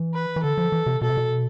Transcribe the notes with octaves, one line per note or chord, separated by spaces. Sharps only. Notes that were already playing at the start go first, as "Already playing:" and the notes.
Already playing: E3
B4
E3
D3 A4
F3
E3
C3
B2 A4
C3
B2